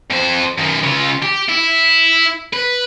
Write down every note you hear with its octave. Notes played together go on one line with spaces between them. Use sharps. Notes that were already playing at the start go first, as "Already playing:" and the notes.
F2 C5
F#2 D#3
C#3 F4
G4
E4
B4